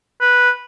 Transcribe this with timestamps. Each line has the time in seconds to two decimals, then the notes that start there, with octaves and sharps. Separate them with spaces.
0.21 B4